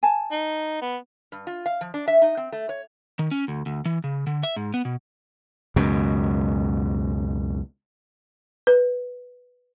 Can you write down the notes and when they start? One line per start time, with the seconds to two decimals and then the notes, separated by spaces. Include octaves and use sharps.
0.03 G#5 A5
0.31 D#4
0.82 B3
1.32 G2
1.47 F4
1.66 F5
1.81 F3
1.94 D4
2.08 E5
2.22 D#4
2.37 C4
2.52 A3
2.69 C#5
3.19 D#3
3.31 C#4
3.48 D2
3.66 D2
3.85 E3
4.04 C#3
4.27 D3
4.43 E5
4.56 G#2
4.74 B3
4.85 B2
5.76 C#2 F#2 B2
8.67 B4